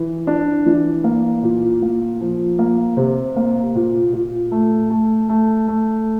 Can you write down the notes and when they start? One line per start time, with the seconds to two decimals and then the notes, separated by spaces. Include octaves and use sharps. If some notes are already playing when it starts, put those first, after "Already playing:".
Already playing: E3
0.27 D4
0.66 E3
1.04 A#3
1.43 A#2
1.82 A#3
2.21 F3
2.59 A#3
2.97 C3
3.36 A#3
3.75 A#2
4.13 A#2
4.52 A3
4.90 A3
5.29 A3
5.68 A3